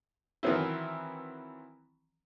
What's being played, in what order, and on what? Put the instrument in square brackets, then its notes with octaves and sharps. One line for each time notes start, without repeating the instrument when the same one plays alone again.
[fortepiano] D#3 E3 F#3 B3 C4 E4